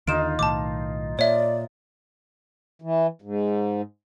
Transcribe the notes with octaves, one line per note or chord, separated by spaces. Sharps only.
D#2 D3 D#4 F4 D7 E7
B1 A2 D#3 A5 D6
A#2 C#5 D5 E5
E3
G#2